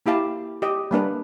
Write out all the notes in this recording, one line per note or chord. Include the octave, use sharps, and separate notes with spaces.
A#3 E4 G4 F5 A5
G4 D#5
G3 A#3 D4 B4